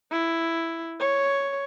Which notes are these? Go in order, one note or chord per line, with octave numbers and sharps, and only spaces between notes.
E4
C#5